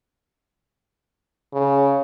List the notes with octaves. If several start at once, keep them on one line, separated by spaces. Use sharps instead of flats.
C#3